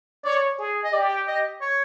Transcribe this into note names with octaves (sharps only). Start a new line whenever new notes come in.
C#5 D5
G#4
D#5
G4 D5
D#5
C#5